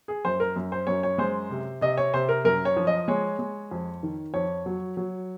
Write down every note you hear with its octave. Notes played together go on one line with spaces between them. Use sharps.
G#4
F#2 C5
A#4
F#2
C5
F#2 C#5
C#5
G#3 C5
C3
C3 D#5
C#5
C3 C5
A#4
F#2 A#4
C#5
F3
D#5
G#3 C#5
G#3
F2
D#3
F2 C#5
F#3
F#3